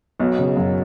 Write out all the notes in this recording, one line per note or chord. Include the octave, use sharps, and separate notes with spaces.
B1 B2 F#3
C#3
F#2